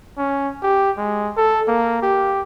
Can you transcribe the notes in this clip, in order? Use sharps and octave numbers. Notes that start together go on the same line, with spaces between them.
C#4
G4
G#3
A4
A#3
G4